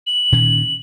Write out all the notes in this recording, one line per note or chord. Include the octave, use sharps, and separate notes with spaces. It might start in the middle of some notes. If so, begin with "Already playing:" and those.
F#7
A#2 D#3 C#4